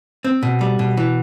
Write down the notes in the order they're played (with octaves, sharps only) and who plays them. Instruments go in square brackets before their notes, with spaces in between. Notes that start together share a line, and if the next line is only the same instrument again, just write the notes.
[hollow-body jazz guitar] C4
B2
G3
B2
E3